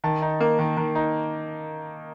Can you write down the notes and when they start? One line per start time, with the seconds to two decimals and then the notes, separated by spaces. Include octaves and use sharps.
0.04 D#3 A5
0.22 D#4
0.40 A#3
0.59 D#3
0.77 D#3
0.95 D#4